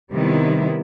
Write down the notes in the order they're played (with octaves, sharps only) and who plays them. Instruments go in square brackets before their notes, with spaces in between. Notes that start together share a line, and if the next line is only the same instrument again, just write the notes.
[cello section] C3 D#3 G3 B3 E4